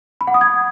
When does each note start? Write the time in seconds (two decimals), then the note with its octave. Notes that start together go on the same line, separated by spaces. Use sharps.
0.21 B5
0.27 F#5
0.34 D#6
0.41 G#6